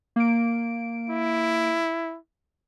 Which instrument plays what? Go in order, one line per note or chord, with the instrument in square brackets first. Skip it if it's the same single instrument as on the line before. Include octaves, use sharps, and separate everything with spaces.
[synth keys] A#3 D7
[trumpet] E4